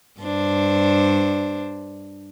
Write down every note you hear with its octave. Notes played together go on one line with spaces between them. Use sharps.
G2 D4 C5